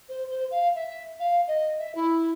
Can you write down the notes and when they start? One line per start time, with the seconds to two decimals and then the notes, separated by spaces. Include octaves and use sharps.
0.08 C5
0.30 C5
0.51 F5
0.75 E5
1.19 F5
1.47 D#5
1.78 E5
1.95 E4